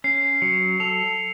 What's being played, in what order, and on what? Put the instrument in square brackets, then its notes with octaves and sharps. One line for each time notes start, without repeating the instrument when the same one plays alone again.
[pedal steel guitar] C#4 [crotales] C7
[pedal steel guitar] F#3 [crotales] C#7
[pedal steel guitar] A4 [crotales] F7